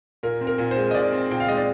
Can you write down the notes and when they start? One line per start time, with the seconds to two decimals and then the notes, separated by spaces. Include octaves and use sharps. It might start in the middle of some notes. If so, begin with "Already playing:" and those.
0.23 A#2 A#4
0.41 C4
0.47 A#4
0.58 A#2
0.71 C5
0.76 G#3
0.91 D#5
0.95 A#2 D5
1.12 C4
1.30 A#2 G5
1.40 F5
1.48 G#3 D#5
1.57 D5